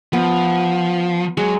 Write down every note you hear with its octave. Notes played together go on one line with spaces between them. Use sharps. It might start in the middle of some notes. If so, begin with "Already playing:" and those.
F3 B3
F#3 G#3